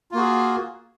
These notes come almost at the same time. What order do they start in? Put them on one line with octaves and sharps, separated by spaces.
F4 A#3 F#4 G#4